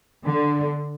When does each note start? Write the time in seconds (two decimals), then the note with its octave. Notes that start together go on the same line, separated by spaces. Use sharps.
0.25 D3